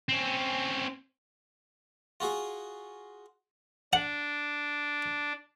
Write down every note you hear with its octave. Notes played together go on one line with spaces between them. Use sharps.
C4 C#4
F4 F#4 G#4
D4 F#5